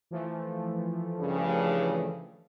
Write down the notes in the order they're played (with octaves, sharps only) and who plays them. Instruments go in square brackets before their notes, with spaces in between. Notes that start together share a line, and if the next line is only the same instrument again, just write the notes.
[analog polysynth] E3 F3 A3
[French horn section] G2 C#3